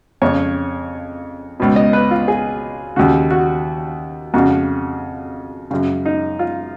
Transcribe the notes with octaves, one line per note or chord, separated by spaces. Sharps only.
F2 C#3 C#5
C#2 B2
D#5
B4
F4
G#4
D#2 C#3 F#4
F#4
F2 C#3 F#4
F#2 C#3
D#4
F4